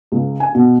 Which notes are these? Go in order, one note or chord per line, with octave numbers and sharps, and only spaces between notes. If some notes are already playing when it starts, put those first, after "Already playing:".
C#2
G#5
B2